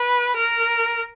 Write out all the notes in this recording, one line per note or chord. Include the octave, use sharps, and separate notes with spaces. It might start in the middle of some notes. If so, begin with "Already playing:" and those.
Already playing: B4
A#4